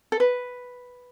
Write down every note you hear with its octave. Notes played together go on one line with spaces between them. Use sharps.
A4
B4